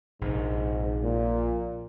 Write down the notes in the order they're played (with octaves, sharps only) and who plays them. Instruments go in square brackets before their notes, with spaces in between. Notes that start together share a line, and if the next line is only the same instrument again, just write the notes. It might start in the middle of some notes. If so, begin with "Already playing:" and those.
[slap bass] A#1 C3 [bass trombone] G#2
[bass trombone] A#2